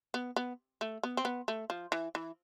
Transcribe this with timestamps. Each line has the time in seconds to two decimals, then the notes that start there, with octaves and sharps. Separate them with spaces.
0.14 B3
0.36 B3
0.81 A3
1.03 B3
1.17 C4
1.25 B3
1.48 A3
1.70 F3
1.92 E3
2.15 E3